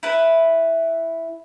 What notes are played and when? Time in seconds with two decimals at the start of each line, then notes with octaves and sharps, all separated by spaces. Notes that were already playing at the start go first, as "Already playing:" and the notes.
0.03 E4 B4